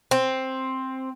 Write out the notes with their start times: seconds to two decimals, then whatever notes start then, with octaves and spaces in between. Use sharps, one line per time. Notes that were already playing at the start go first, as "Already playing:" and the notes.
0.11 C4